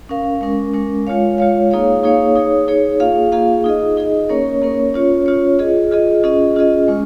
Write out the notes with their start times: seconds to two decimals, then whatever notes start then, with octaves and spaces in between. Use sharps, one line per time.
0.09 C#4 A#4 F5
0.41 G#3 C#4 A#4
0.74 G#3 C#4 A#4
1.07 G#3 F4 C#5 F5
1.38 G#3 F4 C#5 F5
1.70 A#3 D#4 G#4 C#5 F5
2.03 A#3 D#4 G#4 C#5 F5
2.36 D#4 G#4 C#5
2.68 D#4 G#4 C#5
3.00 A#3 F4 G#4 F5
3.32 A#3 F4 G#4 F5
3.64 D#4 G#4 D#5
3.97 D#4 G#4 D#5
4.29 A#3 C#4 A#4 C#5
4.62 A#3 C#4 A#4 C#5
4.94 C#4 F4 C#5
5.26 C#4 F4 C#5
5.59 F4 G#4 D#5
5.91 F4 G#4 D#5
6.23 C#4 F4 G#4 D#5
6.56 C#4 F4 G#4 D#5
6.88 G#3 C#4